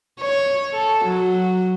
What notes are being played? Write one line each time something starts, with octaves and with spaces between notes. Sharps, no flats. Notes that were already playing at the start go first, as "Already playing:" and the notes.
C#5
A4
F#3